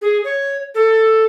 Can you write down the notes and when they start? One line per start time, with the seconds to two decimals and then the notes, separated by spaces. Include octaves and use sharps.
0.02 G#4
0.24 C#5
0.75 A4